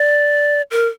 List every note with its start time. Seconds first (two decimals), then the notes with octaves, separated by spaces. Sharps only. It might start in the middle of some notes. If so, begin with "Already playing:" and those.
Already playing: D5
0.71 A#4